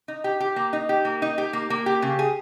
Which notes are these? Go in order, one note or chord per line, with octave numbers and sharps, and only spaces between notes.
D#4
G4
G4
A#3
D#4
G4
A#3
D#4
G4
A#3
A#3
G4
C#3
G#4